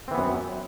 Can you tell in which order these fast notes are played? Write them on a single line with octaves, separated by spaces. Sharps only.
C4 E3 B3 F#2